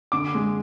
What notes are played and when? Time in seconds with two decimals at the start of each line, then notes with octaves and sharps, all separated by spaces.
0.12 D3 D6
0.35 G#3